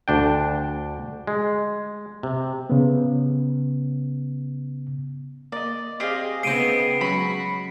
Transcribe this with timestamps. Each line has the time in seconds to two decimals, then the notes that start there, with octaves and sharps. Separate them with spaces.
0.08 D2 D4 G5
1.27 G#3
2.23 C3
2.70 C#3 B3
5.52 A#3 D5 D#5
6.00 C4 G4 G#4 D#5 F5 F6
6.43 C#3 B3 C4 D#5 C7 D7 D#7
7.01 F#3 G#3 C#4 F#4 B5